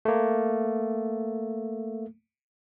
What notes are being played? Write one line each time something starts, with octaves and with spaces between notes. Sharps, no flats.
A3 A#3